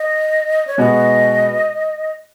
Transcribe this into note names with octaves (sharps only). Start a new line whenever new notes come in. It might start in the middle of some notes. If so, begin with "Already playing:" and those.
Already playing: D#5
C#5
B2 G#3 B3 F#4 D#5